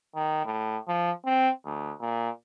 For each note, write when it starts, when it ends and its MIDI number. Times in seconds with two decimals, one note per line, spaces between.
0.15 0.42 51
0.45 0.77 45
0.88 1.11 53
1.25 1.50 60
1.65 1.93 38
2.00 2.30 46